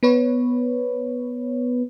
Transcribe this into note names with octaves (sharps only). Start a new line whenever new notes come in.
B3 B4 C#5